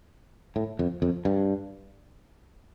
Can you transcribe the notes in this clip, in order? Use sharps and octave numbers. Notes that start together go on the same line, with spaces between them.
A2
F2
F2
G2